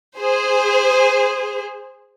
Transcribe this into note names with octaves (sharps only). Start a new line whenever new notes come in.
G#4 C5